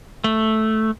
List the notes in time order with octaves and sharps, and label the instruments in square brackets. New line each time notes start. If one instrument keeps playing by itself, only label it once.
[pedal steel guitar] A3